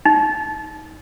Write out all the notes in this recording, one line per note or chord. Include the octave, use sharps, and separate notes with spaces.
D#4